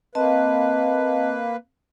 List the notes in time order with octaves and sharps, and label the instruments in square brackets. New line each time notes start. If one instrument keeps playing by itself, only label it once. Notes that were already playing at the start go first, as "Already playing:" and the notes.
[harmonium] A#3 B4 [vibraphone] C4 D#5 A5